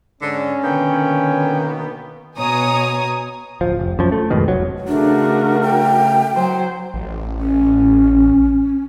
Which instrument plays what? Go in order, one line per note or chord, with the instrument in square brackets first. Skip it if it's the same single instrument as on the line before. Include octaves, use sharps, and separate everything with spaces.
[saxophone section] G#2 D3 [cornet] C#4
[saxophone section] B2 A#3 B3 [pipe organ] D3 G5 [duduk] D#3
[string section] B2 C#5 G#5 A#5 D#6
[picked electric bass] D1 F3
F1
F#2 F3
A3
F2 G#2 B2 D#3
F1 C#2 F#3
[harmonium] C#3 A3 [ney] D4 [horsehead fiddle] F#4 A#4
[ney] G5
[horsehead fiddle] F#3 C5
[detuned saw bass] A1
[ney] C#4